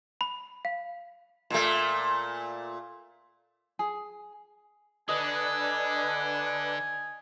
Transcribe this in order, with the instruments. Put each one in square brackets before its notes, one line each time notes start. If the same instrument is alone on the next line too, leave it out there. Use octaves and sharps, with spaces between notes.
[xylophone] B5
F5
[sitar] A#2 A3
[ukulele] G#4
[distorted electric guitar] D3 [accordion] D4 B4 [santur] D#5 [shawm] G#5